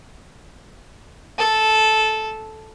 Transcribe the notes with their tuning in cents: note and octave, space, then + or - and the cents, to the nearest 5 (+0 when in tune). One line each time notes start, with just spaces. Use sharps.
A4 -10